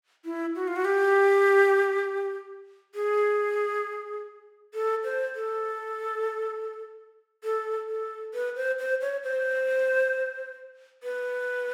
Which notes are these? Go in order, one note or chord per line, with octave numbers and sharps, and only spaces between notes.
E4
F#4
F4
F#4
G4
G#4
A4
C5
A4
A4
A4
B4
C5
C5
C#5
C5
B4